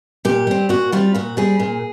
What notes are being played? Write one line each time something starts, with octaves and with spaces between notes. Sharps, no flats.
A#2 G4
G3 C4
A#2 F#4
G3 C4 F4
A#2 F#4
G3 C4 G#4
A#2